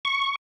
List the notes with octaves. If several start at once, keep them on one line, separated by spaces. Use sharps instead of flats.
C#6